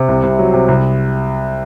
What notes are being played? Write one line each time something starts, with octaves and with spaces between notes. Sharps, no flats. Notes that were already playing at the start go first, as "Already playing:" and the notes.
Already playing: C3
C2
C2
F#3
C3
C2